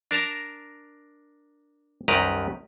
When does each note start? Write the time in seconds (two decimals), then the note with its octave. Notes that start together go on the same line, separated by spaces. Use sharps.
0.11 D4 A#4 A5 A#5
2.08 C2 F#2 D#3 G4 B4 A#5